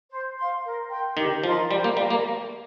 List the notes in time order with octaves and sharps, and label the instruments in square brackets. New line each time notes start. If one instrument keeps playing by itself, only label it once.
[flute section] C5
F5 C6
A#4
G5 C6
[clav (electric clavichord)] D#3 [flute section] G4
[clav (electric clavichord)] F3 [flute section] A#4 D#5 C6
[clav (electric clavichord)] G3 [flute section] C5
[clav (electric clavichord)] A#3
[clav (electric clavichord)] G3 [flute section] F5 A#5
[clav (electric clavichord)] A#3